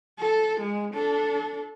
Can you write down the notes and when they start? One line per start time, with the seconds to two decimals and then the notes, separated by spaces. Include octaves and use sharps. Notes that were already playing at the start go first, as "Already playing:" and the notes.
0.19 A4
0.61 G#3
0.94 D4 A4